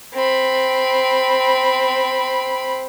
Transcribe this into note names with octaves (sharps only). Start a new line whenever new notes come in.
C4 B5